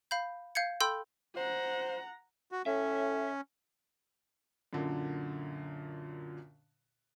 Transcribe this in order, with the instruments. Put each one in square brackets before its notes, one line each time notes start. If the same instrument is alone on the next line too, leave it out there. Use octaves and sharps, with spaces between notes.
[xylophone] F5 B5 G6
F5 G6 G#6 C#7
A4 G5 B5 C6 E6 G6
[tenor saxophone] C5 [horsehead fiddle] F#5 A#5
[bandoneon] F#4
[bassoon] A2 [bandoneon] C#4 [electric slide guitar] E5
[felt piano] F#2 A#2 D3